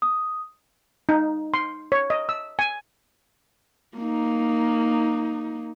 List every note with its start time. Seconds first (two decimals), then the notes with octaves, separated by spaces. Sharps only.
0.02 D#6
1.09 D#4
1.54 C6
1.92 C#5
2.10 D#5
2.29 E6
2.59 G#5
3.97 A#3 D#4